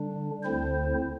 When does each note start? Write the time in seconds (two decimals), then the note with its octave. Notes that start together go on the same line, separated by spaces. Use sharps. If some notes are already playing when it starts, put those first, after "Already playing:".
Already playing: D3 G3 D4
0.43 D2 D3 C4 E4 C5